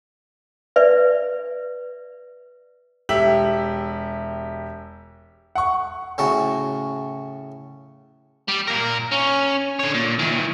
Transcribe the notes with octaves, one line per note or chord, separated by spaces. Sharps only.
B4 D5 E5
E1 G4 E5 F#7
F#5 C#6
A2 C#3 F#4 A#5
G3
A#2 A#4
C#4
D3 C#5
A#2
D#3 E3